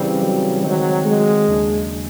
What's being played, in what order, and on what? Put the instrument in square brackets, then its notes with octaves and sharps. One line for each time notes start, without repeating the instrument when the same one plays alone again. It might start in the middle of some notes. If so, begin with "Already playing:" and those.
Already playing: [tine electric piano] C#3 E3 G3 C4
[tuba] F#3
[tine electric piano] D#3 G#3 C4 [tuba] F#3
[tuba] G#3
[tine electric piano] D#2 C#3 F#3 A#3 D4